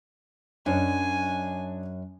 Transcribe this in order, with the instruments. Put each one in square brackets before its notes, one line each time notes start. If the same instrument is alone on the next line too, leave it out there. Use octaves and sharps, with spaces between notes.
[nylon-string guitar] F#2 [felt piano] D4 C#5 D#5 [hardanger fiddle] G#5